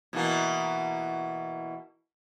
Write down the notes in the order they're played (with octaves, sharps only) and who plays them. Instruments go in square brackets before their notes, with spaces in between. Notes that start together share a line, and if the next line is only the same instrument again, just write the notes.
[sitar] B2 E3 A#3